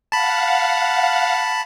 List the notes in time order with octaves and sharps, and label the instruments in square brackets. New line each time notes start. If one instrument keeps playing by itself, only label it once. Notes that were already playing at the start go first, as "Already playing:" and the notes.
[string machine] F5 F#5 [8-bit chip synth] A5 B5